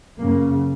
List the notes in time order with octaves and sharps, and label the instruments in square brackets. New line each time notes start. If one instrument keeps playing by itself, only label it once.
[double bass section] F#2 C#3 A#3